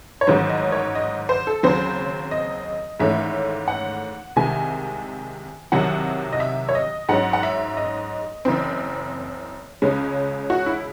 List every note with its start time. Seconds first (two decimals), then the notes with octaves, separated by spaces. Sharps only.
0.21 C#5
0.27 A1 G#2 D#3 F#3 C#4 C5
0.49 D#5
0.72 C#5
0.95 D#5
1.29 C5
1.47 A4
1.63 D#2 C#3 F#3 C4 C5
2.31 D#5
3.00 G#1 G#2 E3 A3 C#4 E5
3.68 F#5
4.36 C2 C3 D#3 G#3 G#5
5.72 C2 C3 D#3 F#3 F#5
6.33 D#5
6.40 E5
6.69 C#5
6.75 D#5
7.09 G#2 F#3 C#4 F#5
7.33 F#5
7.43 E5
7.77 D#5
8.45 F#1 F#2 E3 C4
9.82 C#2 C#3 G#3 C#4
10.50 F#4
10.66 E4